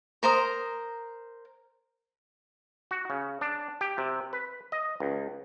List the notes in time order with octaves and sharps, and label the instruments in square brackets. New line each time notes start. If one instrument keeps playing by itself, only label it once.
[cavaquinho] A#4 C5 A#5 D#6
[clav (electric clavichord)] F#4
C#3
D4
G4
C3
B4
D#5
C#2